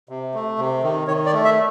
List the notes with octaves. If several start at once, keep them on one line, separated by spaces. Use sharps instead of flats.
C3
A3
C3
D#3
D#3 C#5
D5
A3
E5